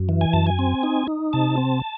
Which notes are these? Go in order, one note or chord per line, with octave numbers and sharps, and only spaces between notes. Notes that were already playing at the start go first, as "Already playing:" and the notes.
Already playing: F#2
E3
G#5
F#2 A5
G#5
C4
D#4
D#4
C3 A5
C4